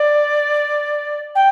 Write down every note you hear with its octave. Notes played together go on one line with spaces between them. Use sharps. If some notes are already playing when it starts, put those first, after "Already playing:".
Already playing: D5
G5